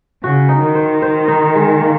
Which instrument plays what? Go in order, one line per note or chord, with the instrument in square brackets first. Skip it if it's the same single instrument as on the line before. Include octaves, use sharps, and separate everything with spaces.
[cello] C#3 [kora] F#4
[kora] D#4
[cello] D#3
[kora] C5
C5
D#4
G#3
A#3